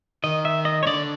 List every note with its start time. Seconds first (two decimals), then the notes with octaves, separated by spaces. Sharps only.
0.24 D#3 D#5
0.45 E5
0.65 D#5
0.83 C#5
0.87 D3 D5